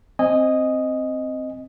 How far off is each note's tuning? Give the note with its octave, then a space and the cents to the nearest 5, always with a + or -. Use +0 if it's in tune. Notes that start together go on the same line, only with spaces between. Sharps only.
C4 +0 D#5 +0 G#5 -20